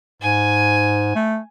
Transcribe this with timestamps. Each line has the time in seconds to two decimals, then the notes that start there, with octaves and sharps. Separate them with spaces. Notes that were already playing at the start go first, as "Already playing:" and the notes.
0.22 G#2 G#5
1.15 A3